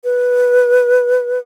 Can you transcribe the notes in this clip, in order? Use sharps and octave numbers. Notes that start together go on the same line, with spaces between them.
B4